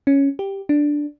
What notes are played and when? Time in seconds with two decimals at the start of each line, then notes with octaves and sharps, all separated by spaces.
0.07 C#4
0.39 G4
0.69 D4